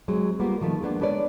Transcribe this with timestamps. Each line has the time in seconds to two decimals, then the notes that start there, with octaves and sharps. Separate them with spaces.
0.08 F#3 G#3 C4
0.40 G3 A#3 B3 F4 A#4
0.61 D#3 F3 A3
0.81 G#3 A#3 B3 D4
1.00 G#3 D4 B4 C#5 D5